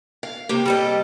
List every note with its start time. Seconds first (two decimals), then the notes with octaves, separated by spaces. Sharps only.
0.23 F5
0.49 C3 A#3 G4
0.66 G3 A4 D#5